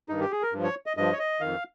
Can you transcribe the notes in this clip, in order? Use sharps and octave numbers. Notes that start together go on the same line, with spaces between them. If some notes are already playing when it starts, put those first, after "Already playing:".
G2 D#3 D#4
G4
G#4
A#4
G2 F3
C#5
D#5
G2 F3 D#5
C#5
D#5
F2 D#3 F5